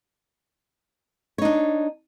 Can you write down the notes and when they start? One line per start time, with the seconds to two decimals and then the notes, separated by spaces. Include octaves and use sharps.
1.38 C#5
1.42 D#4
1.45 D4